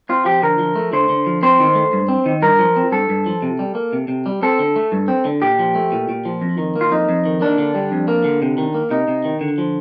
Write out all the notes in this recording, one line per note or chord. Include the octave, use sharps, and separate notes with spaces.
C4 F4
F3 G4
D3 A#4
F3
A3
D3 C5
D3
F3
C4 C5
D#3
A3
G2
C4
D#3
G2 A#4
F3
C4
G2 A4
G2
F3
C3
G3
A#3
C3
C3
G3
C4 A4
D3
A3
G2
C4
D3
A#2 G4
F3
A3
A#2
A#2
F3
F2
D#3
A#3
F4
F2 D#4
F2
D#3
A#3 D4
D3
G3
F2
A#3
D3
C3
D#3
A#3
C3 D#4
C3
D#3
D3
F3